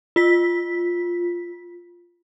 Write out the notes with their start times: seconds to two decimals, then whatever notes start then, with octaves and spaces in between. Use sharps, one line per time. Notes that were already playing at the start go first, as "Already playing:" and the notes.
0.16 F4 B6